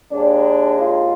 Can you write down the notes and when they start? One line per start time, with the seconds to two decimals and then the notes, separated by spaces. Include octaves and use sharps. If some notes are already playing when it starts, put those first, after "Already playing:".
0.11 D#2 D#3 G#3 D4
0.78 F4